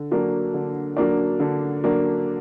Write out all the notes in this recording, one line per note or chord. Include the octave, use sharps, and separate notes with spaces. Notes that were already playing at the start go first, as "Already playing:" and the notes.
Already playing: D3
F#3 A#3 D4
D3
F#3 A#3 D4
D3
F#3 A#3 D4